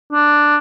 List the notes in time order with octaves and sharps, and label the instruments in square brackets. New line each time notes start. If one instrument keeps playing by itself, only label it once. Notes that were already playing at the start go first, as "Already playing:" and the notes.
[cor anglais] D4